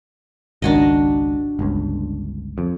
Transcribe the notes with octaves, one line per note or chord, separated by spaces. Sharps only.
G#1 C#2 D#3 D4 F#4 D#5
G1 C#2
F2